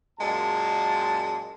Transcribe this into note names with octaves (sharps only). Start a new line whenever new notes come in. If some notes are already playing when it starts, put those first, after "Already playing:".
F#2 A#2 G#3 A5